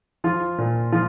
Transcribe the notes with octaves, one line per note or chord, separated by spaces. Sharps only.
F3 F4
A#2
F3 F4